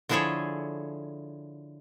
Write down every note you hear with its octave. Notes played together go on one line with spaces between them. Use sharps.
D3 F3 E4 G#4 A4 C#5